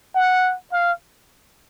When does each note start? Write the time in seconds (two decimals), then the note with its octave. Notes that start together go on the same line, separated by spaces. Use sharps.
0.15 F#5
0.72 F5